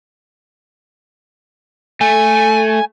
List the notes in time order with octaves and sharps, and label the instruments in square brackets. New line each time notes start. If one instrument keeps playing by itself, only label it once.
[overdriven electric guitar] A3 [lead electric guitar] G#5